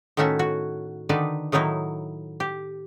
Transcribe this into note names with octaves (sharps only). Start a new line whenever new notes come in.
A2 D#3 A3 C#4 F#4 E5
F#4
D3 D#3 D#4 B4 D5
A2 D#3 F#3 D#4 E4
G4